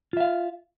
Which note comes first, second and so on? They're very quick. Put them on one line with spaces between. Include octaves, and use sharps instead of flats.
F4 E5 F5